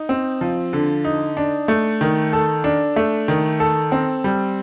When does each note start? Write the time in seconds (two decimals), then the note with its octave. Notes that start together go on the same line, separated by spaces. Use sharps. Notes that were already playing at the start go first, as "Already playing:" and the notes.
Already playing: D#4
0.09 C4
0.41 F3
0.73 D3
1.05 D#4
1.37 D4
1.68 A3
2.01 D#3
2.33 A4
2.64 D4
2.96 A3
3.28 D#3
3.60 A4
3.92 C4
4.24 G3